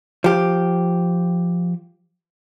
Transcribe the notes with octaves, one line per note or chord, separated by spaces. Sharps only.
F3 G4